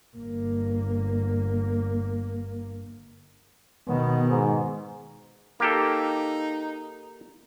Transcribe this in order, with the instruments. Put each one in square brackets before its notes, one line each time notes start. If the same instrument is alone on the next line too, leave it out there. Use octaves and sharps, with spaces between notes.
[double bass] G1 A#3
[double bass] B2 D#3 [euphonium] B3
[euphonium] G#2
[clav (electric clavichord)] A#3 G4 A4 [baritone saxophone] D#4